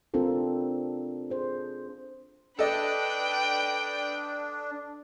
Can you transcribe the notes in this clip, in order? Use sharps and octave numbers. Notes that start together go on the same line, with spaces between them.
C4 D4 F4 A4 A#4
G#4 C5
D4 A4 B4 D#5 G5